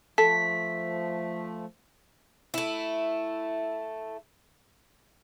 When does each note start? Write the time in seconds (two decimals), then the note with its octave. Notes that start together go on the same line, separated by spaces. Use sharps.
0.18 F3 A3 A4 B6
2.54 A3 E4